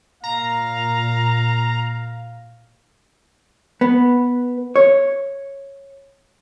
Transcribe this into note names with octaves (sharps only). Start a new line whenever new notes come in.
A#2 F5 A#5
B3
C#5